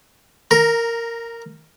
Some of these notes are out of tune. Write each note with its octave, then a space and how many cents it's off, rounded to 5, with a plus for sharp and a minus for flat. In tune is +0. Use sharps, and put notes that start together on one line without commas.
A#4 -10 A#5 +10